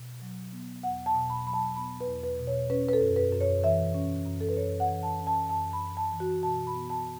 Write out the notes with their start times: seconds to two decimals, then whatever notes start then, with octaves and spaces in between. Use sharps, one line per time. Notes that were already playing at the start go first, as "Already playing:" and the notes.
Already playing: B2
0.21 F#3
0.52 B3
0.83 E2 F#5
1.06 A5
1.14 B2
1.30 B5
1.46 F#3 B5
1.54 A5
1.76 B3 B5
2.01 B4
2.08 E2
2.23 B4
2.39 B2
2.47 C#5
2.70 C#4 B4
2.89 B4
2.93 A4
3.01 F#2
3.16 B4
3.32 F#2
3.41 C#5
3.64 E3 E5
3.95 C#4
4.25 F#2
4.41 A4
4.49 B4
4.57 F#2 C#5
4.80 F#5
4.87 E3
5.03 A5
5.19 C#4
5.27 A5
5.49 F#2 A5
5.73 B5
5.81 F#2
5.97 A5
6.13 E3
6.20 F#4
6.43 B2 A5
6.67 B5
6.74 B3
6.90 A5